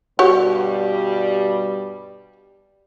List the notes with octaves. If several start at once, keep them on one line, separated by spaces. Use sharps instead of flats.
G2 B2 G3 F#4 G4 C#5